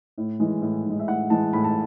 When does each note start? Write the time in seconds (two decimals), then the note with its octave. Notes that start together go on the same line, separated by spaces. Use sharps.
0.18 A2
0.40 E3 G#3
0.62 A2
0.85 E3 G#3
0.99 E5
1.08 A2 F#5
1.30 E3 G#3 A5
1.53 A2 B5
1.64 A5